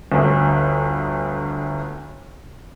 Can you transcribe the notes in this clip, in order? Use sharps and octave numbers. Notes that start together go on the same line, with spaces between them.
G1 D2